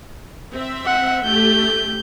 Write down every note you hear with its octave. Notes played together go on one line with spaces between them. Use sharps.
C4 E5
F#5
A3 G4 G6